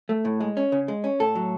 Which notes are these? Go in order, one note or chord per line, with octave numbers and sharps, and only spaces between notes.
A3
A2
G#3
C#4
C#3
G#3
C#4
A2 A4
F#3